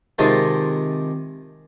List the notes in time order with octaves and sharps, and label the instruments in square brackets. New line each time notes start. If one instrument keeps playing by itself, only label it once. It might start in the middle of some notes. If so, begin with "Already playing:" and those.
[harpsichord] C3 D#3 G#3 F4 A5